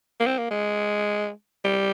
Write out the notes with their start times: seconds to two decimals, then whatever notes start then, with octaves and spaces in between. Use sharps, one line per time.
0.20 A#3
0.26 C4
0.38 A#3
0.51 G#3
1.65 G3